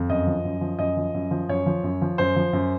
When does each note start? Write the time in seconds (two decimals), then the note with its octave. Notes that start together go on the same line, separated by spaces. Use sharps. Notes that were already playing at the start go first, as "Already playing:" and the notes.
Already playing: F2
0.09 F#2 D#5
0.27 F3
0.45 F#2
0.61 F3
0.79 F#2 D#5
0.97 F3
1.14 F#2
1.31 F3
1.49 F#2 C#5
1.66 F3
1.83 F#2
2.02 F3
2.18 F#2 C5
2.36 F3
2.53 F#2